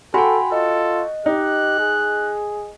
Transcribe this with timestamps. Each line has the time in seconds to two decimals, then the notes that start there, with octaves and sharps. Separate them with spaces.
0.14 F#4 A4 G5 G#5 B5 C6
0.52 F4 A4 D#5
1.26 D#4 G4 F#6
1.79 G#4